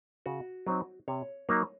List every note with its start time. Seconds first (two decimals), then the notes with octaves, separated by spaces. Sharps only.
0.26 C#3 F#4
0.67 F#3 C4 D#4
1.08 C3 C#5
1.49 F#3 A#3 D#4